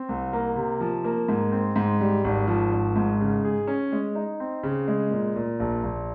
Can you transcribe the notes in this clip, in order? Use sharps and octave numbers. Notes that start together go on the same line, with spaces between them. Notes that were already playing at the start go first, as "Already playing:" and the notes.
Already playing: C4
C2
A#3
C3
F3
A#3
G#2
C4
G#2
G3
G#1
F3
G#1
G#2
C#3
G#4
C#4
G#3
D#4
C4
C#3
G#3
A#2
A#2
A#1
A#1